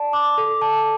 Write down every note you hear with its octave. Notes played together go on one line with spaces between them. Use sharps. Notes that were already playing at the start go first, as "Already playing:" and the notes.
Already playing: D5 A5
D6
A4
A5